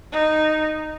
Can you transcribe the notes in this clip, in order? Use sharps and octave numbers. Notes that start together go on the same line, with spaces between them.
D#4